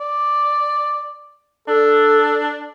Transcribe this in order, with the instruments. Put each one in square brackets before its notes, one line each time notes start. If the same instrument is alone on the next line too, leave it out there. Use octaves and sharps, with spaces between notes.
[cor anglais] D5
[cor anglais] D4 [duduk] A4